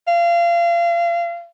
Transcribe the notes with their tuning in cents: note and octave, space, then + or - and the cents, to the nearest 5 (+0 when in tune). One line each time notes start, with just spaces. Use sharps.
F5 -30